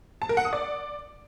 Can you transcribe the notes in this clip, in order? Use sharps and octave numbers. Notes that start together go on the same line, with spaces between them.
A5
A#4
F#5
D#6
D5